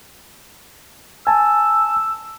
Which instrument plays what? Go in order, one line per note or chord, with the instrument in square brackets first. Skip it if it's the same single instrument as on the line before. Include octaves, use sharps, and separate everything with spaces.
[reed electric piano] G#5 A5 [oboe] E6